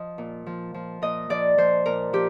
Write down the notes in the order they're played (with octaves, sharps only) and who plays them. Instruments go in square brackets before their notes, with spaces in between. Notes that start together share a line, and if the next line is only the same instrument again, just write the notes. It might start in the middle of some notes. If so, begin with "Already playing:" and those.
Already playing: [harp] F3 D#5
A#2
F3
F3
A#2 D#5
F3 D5
F3 C5
A#2 A#4
F3 G4